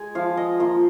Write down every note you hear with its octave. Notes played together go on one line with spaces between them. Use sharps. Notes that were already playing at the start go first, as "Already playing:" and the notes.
Already playing: G#3 G#5
F3 F5
D#5
A#3 F4